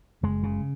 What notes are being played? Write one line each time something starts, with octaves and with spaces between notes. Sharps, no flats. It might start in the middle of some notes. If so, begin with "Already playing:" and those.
F#1 G#3
C#3